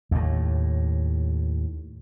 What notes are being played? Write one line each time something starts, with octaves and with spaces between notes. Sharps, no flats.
D#2 A2